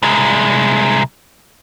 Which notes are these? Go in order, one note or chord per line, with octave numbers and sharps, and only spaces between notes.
C2 G#3